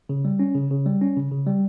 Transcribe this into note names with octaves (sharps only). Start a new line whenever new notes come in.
C#3
G3
C#4
C#3
C#3
G3
C#4
C#3
C#3
G3